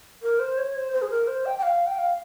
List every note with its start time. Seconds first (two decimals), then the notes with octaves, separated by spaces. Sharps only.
0.23 A#4
0.40 C5
0.58 C#5
0.75 C5
0.93 C5
1.02 G#4
1.10 A#4
1.27 C5
1.46 G5
1.59 G5
1.63 F5
1.87 G5
1.98 F5